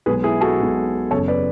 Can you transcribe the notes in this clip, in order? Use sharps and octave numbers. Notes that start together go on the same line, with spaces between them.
B1 B2 G#3 G#4 B4
E4 G#4
F#4 A4
B1 B2 G#3
F#1 E2 C#3 A4 C#5
B4 D5